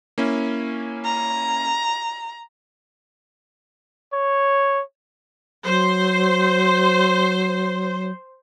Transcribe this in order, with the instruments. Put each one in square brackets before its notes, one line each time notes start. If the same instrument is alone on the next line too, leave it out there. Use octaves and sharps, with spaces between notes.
[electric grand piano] A#3 C#4 E4
[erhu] A#5
[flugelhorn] C#5
[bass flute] F#3 [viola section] C5